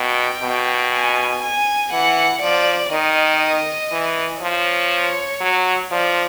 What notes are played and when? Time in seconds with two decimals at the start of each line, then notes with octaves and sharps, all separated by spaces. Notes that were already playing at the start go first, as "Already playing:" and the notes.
Already playing: B2 G5
0.43 B2
0.93 G#5
1.42 G#5
1.92 E3 F#5
2.41 F3 D5
2.92 D#3 D#5
3.92 E3
4.42 F3 C#5
5.41 F#3
5.91 F3 D5